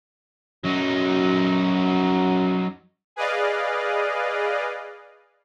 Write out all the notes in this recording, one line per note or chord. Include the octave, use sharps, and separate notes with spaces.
F#2 F#3 D#4
G#4 B4 D5 D#5 F5